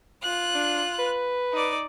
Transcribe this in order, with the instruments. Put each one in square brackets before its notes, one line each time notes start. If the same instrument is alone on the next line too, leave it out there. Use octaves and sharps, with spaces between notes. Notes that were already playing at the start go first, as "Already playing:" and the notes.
[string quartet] F4 F#6
[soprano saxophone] D4
B4
[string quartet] D#4 D5